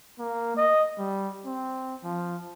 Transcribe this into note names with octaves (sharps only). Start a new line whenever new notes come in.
A#3
D#5
G3
C4
F3